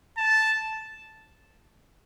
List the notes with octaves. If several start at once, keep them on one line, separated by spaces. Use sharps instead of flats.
A5